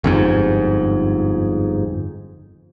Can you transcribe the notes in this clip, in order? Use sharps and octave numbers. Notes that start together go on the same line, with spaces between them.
G1 F2 G#2